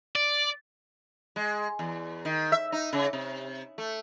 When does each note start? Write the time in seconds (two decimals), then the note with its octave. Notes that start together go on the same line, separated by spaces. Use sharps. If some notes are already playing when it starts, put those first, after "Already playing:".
0.15 D5
1.36 G#3
1.79 E2
2.25 D#3
2.52 E5
2.72 D#4
2.93 C#3
3.13 C3
3.78 A3